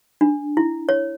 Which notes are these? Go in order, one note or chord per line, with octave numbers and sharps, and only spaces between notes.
D4
E4
C#5